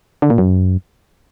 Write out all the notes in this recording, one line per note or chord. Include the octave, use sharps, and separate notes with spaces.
D3
A#2
F#2